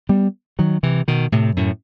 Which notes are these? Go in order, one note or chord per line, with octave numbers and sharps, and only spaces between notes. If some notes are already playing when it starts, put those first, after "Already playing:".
G3 B3
D#3 F#3
C3 E3
B2 D#3
A2 C3
F#2 A2